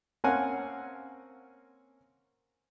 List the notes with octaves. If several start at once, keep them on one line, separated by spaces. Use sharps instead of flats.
A#3 C4 C#4 F5 F#5 G#5